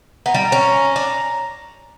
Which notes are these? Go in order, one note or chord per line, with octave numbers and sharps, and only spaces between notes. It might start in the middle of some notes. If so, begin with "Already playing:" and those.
B3 A#5
G3
C#4
D4